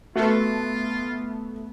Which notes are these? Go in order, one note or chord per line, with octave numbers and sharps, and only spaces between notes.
A3 B3 F4 F#4 A4 B4